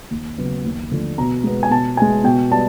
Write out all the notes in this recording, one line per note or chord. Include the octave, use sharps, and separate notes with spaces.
D#2
C#3 F#3 B3
D#2
D3 F3 A3
B2 A#5
G#3 B3
G#5
B2 A5
G#3 B3 G#5
B2 G5
G3 B3 A5